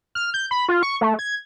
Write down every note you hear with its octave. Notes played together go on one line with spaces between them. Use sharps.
F6
G6
B5
F4
C#6
A3
G#6